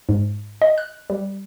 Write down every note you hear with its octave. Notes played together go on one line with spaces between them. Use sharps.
G#2
D#5
F#6
G3